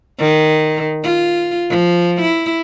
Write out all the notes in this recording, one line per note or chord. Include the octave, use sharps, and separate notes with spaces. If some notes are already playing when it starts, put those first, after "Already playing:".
D#3
F4
F3
E4